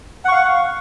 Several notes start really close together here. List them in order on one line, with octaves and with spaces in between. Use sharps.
F#5 C#6 F5